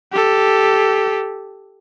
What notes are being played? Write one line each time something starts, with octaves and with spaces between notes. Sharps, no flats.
G4 A4